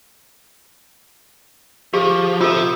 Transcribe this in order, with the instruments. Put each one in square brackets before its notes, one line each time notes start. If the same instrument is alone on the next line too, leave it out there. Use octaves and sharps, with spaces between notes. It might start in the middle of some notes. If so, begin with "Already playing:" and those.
[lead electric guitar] F3 [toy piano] G4 G#4
[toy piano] F4 A4 [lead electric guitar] C5 E5